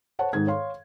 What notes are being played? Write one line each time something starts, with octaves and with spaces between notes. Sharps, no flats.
C5 C#5 F#5 A5
G#2 D#3 G#3 G#6
C#5 F5 C6